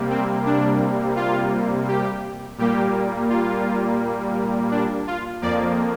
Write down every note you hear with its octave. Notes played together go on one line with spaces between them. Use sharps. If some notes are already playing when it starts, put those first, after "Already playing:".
Already playing: C3 G3 A#3
C4
D4
F4
G4
A#2 G3 A#3 G4
F4
D4
F4
F2 F3 A#3 D5